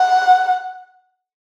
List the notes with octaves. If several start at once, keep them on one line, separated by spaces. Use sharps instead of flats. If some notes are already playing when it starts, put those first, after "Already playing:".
Already playing: F#5